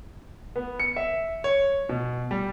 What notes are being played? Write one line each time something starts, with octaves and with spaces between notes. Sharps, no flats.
B3
C#7
E5
C#5
B2
G3